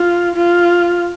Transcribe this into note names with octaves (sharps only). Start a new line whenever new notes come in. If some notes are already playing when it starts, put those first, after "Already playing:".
Already playing: F4
F4